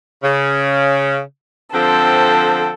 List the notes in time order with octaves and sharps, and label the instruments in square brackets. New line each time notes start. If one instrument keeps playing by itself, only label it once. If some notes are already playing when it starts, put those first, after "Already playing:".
[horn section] C#3
[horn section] D3 F3 C4 [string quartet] A4